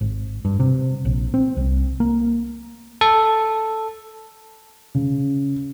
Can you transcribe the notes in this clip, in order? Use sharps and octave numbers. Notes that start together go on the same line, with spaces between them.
G#1
G2
C3
A#1
C4
C2
A#3
A4
C#3